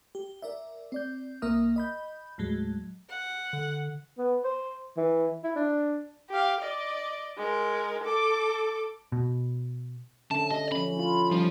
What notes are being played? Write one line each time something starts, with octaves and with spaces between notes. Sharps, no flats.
G4
A#4 D5 E5
C4 D5 G6
C2 A#3 A#4 E5 D#6 F6
D#5 B5 G6
D#2 A2 F#3 G#3
F#5
D3
B3
C5
E3
E4
D4
G4 F5
D5 D#5
G#3 A#4
A4 D6
B2
D3 C#4 E5 A5
G4 D#5
F3 C#4 B5
E4 F4
F3 G3 C#4 D#4